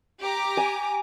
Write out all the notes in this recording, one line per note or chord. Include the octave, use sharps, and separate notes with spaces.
G4 A#5 D6
G#5